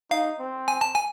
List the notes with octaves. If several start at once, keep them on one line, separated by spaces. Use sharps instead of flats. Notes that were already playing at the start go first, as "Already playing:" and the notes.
D#4 F5
C4
G#5
A5
G#5